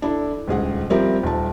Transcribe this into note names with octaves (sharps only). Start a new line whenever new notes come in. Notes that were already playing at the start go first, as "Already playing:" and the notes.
D4 E4 A4
D#1 C#2 G#4 F#5
F3 G3 C4 A#4 E5
D#1 A5